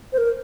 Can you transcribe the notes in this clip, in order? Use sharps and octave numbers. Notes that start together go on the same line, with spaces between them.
C5
A#4